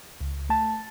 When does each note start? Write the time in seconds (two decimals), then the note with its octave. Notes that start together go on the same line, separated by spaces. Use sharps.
0.20 C#2
0.50 A3 A5